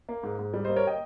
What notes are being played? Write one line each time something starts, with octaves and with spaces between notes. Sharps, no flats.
A#3
G#2
G#2
G3
C5 D#5
A#3
A#4 C#5
D#5 G5